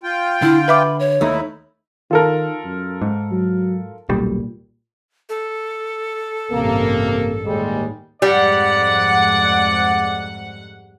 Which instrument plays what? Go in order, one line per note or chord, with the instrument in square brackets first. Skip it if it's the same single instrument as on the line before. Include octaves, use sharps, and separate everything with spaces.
[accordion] F4 G5
[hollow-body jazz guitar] D3 [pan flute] E4
[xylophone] B4 E5 D6 [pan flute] B5
[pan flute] C#5
[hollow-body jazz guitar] D#2 A3 D#4 [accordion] E4
[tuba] D#3 [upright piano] F4 A4 A#4
[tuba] F#2
[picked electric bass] G#2
[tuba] F#3
[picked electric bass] D#1 B1 G3 [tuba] A#2
[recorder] A4
[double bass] A1 G2 [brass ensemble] C3 A#3
[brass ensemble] D#2 G3 G#3 [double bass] A2
[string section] F2 G#2 F#5 [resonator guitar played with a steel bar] G3 [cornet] D5